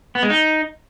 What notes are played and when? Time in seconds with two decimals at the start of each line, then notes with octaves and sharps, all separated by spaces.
0.15 B3
0.23 G#3
0.30 D#4